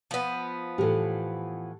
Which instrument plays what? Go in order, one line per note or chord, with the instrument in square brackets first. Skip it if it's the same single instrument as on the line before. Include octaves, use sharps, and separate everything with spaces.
[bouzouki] F3 B3
[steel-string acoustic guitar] A2 E3 [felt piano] G4 A4